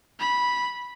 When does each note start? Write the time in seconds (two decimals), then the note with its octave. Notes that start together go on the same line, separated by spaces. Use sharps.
0.20 B5